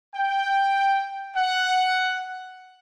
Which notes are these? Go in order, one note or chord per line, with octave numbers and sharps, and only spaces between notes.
G5
F#5